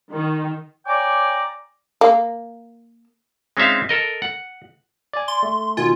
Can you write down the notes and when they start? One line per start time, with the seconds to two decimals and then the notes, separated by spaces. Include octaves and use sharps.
0.13 D#3
0.86 C#5 D5 G5 G#5 A#5 D6
2.01 A#3
3.57 G#3 C4 C#4 D#4 E5 F5
3.89 A4 A#4 D#5
4.22 F#5
5.13 D5 G#5
5.28 C6
5.43 A3
5.77 B2 D#3 F4 G#5